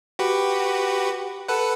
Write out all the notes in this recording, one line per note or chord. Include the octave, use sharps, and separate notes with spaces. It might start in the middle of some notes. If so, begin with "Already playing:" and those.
F#4 G4 B4
A4 B4 F#5